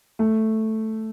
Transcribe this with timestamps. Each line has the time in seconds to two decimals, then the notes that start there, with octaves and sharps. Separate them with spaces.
0.19 A3